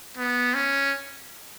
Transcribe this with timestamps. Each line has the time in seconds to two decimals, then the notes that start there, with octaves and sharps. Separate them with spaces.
0.17 B3
0.54 C#4